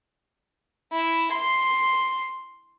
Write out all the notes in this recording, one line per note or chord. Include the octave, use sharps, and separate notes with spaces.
E4
C6